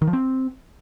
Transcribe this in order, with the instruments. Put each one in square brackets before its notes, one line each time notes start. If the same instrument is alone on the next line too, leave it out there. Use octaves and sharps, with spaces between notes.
[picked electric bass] D#3
F3
C4